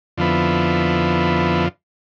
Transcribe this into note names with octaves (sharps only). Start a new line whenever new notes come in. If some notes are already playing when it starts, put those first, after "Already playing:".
F2 D3 F3 B3 E4